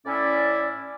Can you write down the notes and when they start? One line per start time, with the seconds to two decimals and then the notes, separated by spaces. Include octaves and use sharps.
0.06 A2 C#4 E4 D5